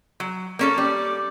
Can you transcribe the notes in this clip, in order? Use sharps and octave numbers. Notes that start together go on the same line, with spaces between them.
F#3
A#3 C#4 A4
G3 D6